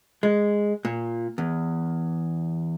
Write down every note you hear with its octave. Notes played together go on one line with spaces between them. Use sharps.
G#3
A#2
E2